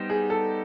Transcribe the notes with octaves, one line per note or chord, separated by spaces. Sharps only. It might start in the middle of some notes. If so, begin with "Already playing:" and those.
Already playing: G3 B3 D#4 G4 C5
G#4
A4